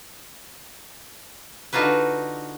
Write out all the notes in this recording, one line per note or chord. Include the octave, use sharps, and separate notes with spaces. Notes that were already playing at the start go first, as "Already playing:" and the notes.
D3 D#4 F4 F#4 B4